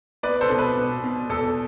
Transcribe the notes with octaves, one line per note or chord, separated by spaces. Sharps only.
B3 B4 D5
A4 C5
B2
B4
B2
B2
E2 A4